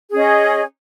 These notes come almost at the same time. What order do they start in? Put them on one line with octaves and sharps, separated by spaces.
G#4 C#4 D#5